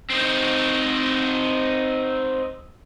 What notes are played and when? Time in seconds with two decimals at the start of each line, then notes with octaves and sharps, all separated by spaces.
0.10 C4 D#4